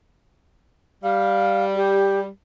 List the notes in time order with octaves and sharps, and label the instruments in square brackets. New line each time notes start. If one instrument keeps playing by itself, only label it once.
[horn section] G3 [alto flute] F5
[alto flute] G4